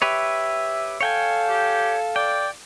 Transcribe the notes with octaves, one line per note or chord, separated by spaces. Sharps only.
G4 B4 C#5 E5
A4 C#5 F5 G5 G#5
G4
D5 G5